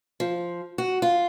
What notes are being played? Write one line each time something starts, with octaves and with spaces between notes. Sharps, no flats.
F3
F#4
F4